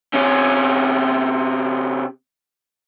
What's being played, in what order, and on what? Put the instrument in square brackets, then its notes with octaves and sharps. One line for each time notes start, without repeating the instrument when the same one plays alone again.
[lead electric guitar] C3 C#4